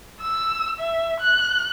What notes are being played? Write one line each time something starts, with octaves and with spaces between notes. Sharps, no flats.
E6
E5
F#6